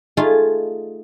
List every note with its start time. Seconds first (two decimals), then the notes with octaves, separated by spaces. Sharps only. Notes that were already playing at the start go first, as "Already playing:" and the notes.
0.17 A3 D#4 F4 G#4